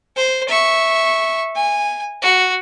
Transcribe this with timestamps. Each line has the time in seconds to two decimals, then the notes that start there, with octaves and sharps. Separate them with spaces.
0.16 C5
0.48 E5 C#6
1.56 G#5
2.22 F#4